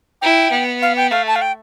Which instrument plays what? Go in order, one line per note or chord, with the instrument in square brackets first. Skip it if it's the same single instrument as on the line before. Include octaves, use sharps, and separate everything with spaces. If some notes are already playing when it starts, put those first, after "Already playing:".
[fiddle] E4 [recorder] G5
[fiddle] B3
[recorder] F5
G5
[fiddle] A3 [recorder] F5
[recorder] A5
F5
G5